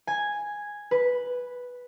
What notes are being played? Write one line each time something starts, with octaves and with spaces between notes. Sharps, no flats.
G#5
B4